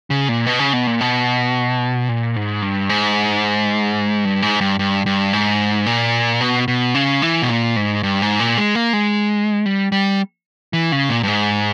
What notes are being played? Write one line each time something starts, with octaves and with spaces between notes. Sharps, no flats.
C#3
A#2
B2
C#3
B2
A#2
B2
A#2
G#2
G2
G#2
G2
G#2
G2
G2
G2
G#2
A#2
B2
B2
C#3
E3
B2
A#2
G#2
G2
G#2
A#2
G#3
A#3
G#3
G3
G3
E3
C#3
A#2
G2
G#2